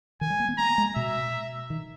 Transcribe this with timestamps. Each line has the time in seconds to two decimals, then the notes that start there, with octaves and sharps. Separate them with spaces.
0.21 D#3 G#5
0.30 G3
0.40 A#3
0.49 B3
0.58 A#3 A#5
0.78 G#3
0.96 B2 E5
1.70 D#3